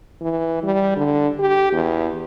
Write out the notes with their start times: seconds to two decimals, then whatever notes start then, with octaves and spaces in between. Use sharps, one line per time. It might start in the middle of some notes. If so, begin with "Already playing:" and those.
0.21 E3
0.63 G3
0.97 D3
1.39 G4
1.73 E2